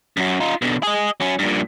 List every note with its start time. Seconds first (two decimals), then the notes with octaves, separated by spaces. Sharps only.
0.17 F#2 F#3
0.40 D#4 F4
0.62 B2 D3
0.83 G#4 D#5
1.21 F#3 C#4
1.39 G2 A#2